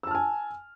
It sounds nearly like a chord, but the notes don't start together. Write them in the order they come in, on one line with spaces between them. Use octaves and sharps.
E6 A5 F6 G#5